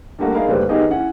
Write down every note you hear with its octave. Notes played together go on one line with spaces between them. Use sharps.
G2 G3 A3 A#3 F#4
D#4 G#4 A#4 E5 F5 B5
F#1 D2 G3 B4 C5
D#3 B3 D#4 G4 G#4 D#5
C#4 E4 F#5